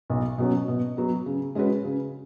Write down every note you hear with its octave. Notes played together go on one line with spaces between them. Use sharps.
B1
B2 F#3 C#4
B2
F#3 B3
C#3
G#3 C#4 F#4 B4
C#3